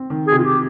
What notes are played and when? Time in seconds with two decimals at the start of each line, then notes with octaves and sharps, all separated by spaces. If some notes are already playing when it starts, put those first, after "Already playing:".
Already playing: C4
0.10 D#3
0.27 G#4
0.32 C3
0.38 F4
0.44 G4